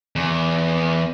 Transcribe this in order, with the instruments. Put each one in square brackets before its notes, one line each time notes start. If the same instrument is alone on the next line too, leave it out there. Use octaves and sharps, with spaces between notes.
[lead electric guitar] E2